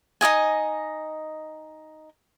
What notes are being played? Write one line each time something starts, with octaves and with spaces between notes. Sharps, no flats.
D#4 F#4 D#5 G#5